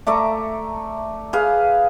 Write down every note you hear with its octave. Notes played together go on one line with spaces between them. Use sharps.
A3 D5 E5 A#5
G#4 B4 F5